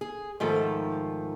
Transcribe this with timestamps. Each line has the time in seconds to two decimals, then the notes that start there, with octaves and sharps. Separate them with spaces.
0.01 G#4
0.40 G#2 D#3 F3 A3